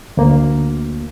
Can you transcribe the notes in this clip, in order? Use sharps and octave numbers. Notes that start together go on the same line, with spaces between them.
D2 A#3